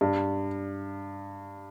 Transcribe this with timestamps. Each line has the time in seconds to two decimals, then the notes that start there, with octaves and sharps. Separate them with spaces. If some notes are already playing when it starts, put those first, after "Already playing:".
0.01 G2